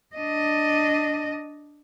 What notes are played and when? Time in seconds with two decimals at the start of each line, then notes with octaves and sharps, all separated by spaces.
0.16 D4 D#5